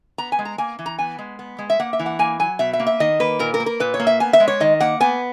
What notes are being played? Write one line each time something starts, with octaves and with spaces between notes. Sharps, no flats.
B3 A#5
G#5
G#3
A#5
A#3 G#5
E3
A#5
B3 G#5
G#3
B3
G#3
E5
A#3 F#5
E5
E3
F#5
A#3 G#5
F#3 G#5
B2 E5
E5
A#3
E5
D#3 D#5
A#3 B4
A#2 A#4
A#4
A#3
A#4
A#2 B4
C#5
A#3
E5
B3 G#5
E5
G#3
C#5
D#3 D#5
A#3 F#5
B3 G#5